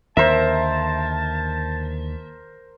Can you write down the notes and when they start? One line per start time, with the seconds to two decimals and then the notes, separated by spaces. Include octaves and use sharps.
0.17 D#2 D3 A#4 C5 E5 A5